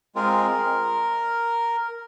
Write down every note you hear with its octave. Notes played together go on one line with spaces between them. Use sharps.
G#3 C4 F4 G#4 A#4